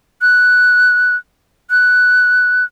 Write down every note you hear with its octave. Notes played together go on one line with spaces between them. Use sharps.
F#6
F#6